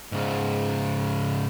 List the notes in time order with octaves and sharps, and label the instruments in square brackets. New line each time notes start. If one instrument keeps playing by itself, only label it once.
[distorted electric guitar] G#2 C#3